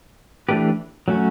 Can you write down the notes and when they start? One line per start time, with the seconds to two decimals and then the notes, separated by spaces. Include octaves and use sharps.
0.49 E3 A3 D4 G4 B4
1.08 F#3 A3 C#4 F#4